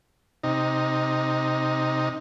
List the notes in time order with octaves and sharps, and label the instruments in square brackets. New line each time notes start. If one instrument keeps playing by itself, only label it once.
[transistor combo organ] C3 D#4